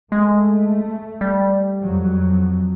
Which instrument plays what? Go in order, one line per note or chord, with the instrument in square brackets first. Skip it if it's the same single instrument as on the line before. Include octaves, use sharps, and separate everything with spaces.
[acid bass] G#3 [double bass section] A3
[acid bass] G3
[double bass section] F2 F#3